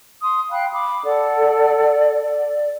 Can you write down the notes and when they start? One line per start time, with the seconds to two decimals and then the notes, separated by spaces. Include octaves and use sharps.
0.22 C6 D#6
0.51 F5 G5 B5 F#6
0.73 B5 D6
1.04 A4 D5 F#5
2.14 D5